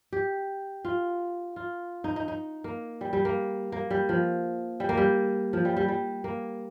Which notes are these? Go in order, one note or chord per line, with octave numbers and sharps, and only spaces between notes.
G4
F4
F4
D#4
D#4
D#4
A#3
G3
G3
A#3
A#3
G3
F3
G3
A#3
G3
F3
G3
G3
G3
A#3